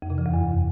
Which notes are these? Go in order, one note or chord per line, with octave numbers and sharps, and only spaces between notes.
F2
C3
E3
E2
F#2